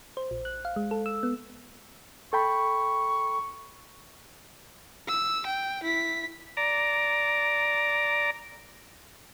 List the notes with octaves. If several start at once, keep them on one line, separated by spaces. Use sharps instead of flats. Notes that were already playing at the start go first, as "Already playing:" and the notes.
C5
A#1
F#6
F5
G#3
A4
E6
B3
A4 G5 B5 C#6
E6
G5
E4 B6
D5 A#5